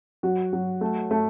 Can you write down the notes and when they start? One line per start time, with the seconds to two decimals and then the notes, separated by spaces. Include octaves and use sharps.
0.23 F#3 F#4
0.53 F#3
0.81 A3
1.11 A3